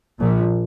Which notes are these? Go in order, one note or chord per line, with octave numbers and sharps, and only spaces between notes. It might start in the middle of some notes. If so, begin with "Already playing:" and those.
A#1 A#2